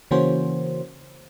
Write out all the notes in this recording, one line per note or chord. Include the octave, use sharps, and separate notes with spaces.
C#3 E3 A#3 C#4 F#4 C5